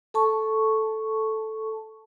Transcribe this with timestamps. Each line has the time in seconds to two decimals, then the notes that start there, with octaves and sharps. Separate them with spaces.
0.14 A4 A5 C#6